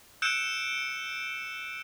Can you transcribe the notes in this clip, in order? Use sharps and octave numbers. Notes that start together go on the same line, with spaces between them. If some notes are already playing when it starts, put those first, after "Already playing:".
E6 F#6 G6 C#7 D7 E7